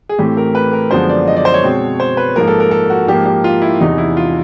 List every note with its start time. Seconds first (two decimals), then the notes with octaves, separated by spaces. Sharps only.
0.09 G#4
0.19 A2 E3 A3 C4 G4
0.37 A#4
0.55 B4
0.73 A#4
0.91 F#2 D3 F3 G#3 B3 C5
1.10 D5
1.27 D#5
1.37 D5
1.45 C5
1.54 C#5
1.63 B2 G#3 C4
2.00 C5
2.17 B4
2.36 G#2 F3 A#3 A#4
2.48 A4
2.60 A#4
2.71 A4
2.90 F#4
3.07 G#2 F3 A#3 G4
3.25 G4
3.44 F4
3.62 E4
3.80 E2 C3 E3 D#4
3.98 E4
4.17 F4